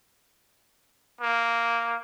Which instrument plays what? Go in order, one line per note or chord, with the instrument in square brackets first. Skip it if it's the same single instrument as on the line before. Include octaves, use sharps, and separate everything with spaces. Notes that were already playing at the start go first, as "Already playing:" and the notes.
[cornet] A#3